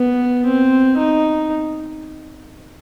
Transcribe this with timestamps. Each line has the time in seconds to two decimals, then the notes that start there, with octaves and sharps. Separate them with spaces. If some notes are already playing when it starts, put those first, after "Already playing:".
Already playing: B3
0.45 C4
0.97 D#4